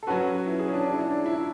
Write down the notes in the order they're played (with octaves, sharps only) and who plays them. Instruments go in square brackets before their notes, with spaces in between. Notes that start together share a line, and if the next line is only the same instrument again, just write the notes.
[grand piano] A4
[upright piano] F#3 C#4 F#4 [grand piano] B4
[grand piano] E4
G#4
C#4
D4
D4
E4
D4
E4
E4